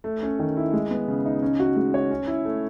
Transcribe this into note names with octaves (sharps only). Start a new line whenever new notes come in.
A3
C#4
D#3
E4
G#3
B3
C#3
D#4
C#4
F#4
G#3
C#5
C#4
E4
A3